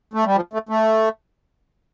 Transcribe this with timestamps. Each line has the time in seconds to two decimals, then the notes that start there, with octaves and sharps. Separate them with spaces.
0.13 A3
0.25 G3
0.36 F3
0.53 A3
0.69 A3